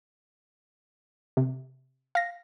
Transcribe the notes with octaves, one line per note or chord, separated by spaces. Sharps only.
C3
F5 A#6